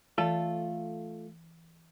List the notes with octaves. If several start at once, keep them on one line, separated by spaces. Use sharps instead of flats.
E3 A3 F4 A4